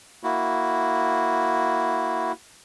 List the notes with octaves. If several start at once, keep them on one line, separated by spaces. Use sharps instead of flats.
A#3 E4 F#4